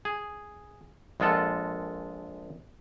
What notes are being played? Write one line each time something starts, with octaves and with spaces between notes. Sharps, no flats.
G#4
A#1 G#3 F4 A4 F#5